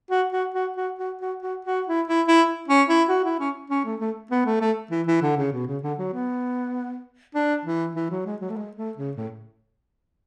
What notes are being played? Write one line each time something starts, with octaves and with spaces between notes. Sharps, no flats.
F#4
F#4
F#4
F#4
F#4
F#4
F#4
F#4
E4
E4
E4
C#4
E4
F#4
E4
C#4
C#4
A3
A3
B3
A3
A3
E3
E3
D3
C#3
B2
C#3
D3
F#3
B3
D4
E3
E3
F#3
G#3
F#3
A3
G#3
A3
C#3
A2